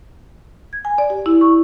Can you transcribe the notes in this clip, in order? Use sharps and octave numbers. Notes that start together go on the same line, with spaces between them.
G#6
G#5
D5
G4
E4
C#6